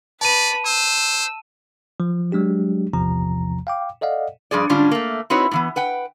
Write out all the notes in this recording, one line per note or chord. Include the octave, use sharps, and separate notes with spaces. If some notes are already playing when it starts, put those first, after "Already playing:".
B4 D5 A5 B5 D#7
C5 E6
F3
F#3 G#3 D4 G4
A1 E2 C3 F3 A#5
F5 G5 D6
A4 D5 D#5 F5 F#5
G2 F3 G#4 D5
G#2 D3 G3 C#4 D4 F4
A3 A#3
C4 D#4 E4 F#4 B4 C#5
A2 E3 B3
B4 F#5 G5